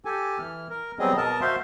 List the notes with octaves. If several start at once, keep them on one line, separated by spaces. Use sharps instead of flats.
G4 A4 G#5
E3 F6
A#4
F#3 G3 B3 C4 G#4 D#5
B2 A#4 D#5 A5
F#4 C5 E5 F5 C6